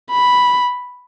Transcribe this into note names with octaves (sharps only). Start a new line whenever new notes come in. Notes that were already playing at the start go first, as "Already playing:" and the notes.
B5